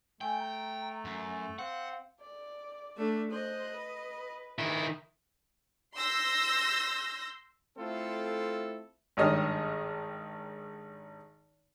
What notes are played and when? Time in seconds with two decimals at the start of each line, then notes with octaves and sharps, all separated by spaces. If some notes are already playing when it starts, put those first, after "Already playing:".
0.21 A3 G5 G#5
0.39 A#5
1.05 F#2
1.59 C4 F5 F#5
2.21 D5
2.97 A3 D4
3.31 C5 D#5 F#6
3.74 B4
4.59 D#3 E4
5.96 C6 E6 G6 A#6
7.77 A3 C4 E4 F4 A4
9.17 G#1 G2 D#3 C#5 D#5 F6